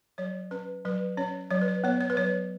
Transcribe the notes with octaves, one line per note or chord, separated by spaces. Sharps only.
F#3 C#5
C#4 B4
F#3 B4
C#4 C#5
F#3 C#5
B4
C#5
B3 C#5
C#5
B4
F#3 C#5